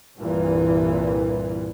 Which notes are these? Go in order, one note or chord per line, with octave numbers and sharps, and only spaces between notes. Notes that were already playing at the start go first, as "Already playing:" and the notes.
C2 G2 A#2 E3